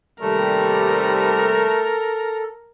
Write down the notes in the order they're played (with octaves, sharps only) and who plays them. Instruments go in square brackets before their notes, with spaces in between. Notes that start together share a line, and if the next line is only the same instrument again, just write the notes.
[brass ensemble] D#2 C3 G3 [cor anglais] A3 [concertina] A4 [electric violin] A#4